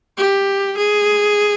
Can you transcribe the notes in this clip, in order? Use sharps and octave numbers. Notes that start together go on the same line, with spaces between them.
G4
G#4